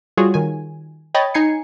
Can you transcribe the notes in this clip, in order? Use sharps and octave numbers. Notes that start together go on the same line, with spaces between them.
G3 F4 F#4 G#4 C#5
D#3 G#5
C#5 D#5 G5 B5 A6
D#4 G#5 G#6 C7 C#7